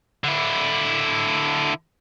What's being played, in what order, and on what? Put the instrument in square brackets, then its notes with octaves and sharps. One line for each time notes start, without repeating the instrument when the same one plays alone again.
[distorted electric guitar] D3 E4